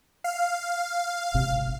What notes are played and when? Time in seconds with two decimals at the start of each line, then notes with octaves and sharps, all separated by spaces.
0.24 F5
1.34 G#1 C3